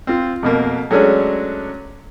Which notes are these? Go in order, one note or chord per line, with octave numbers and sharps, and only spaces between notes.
C4 F4
F2 B2 A#3
F#3 G#3 A3 C#4 D4